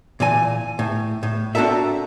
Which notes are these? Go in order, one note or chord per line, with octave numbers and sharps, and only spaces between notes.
A#2 E3 G#5
A2
A2
C4 D4 F#4 A4 A#4 E5